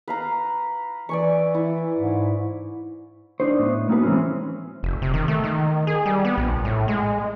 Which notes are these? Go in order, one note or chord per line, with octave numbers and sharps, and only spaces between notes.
B4 F5 A#5
E3 D5 G#5 C#6
E4
G#2
D4 D#4 C5
A2 B3
A#3 D#4 F#4 G#4 B4
E3 G#3 C4 C#4
F1
C3
D#3
A3
D#3
G#4
G3
B3
A#1
A2
G#3